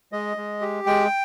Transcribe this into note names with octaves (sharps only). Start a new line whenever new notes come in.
G#3 D#5
G#3
G4
G#3 G5